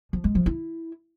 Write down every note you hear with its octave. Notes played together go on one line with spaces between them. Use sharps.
F3
G#3
F3
E4